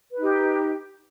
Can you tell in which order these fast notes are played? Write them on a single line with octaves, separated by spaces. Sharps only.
B4 D#4 G4